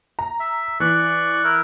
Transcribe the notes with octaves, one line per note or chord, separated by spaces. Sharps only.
A#5
E5
E3 D5 C#6 F#6
E4 A#4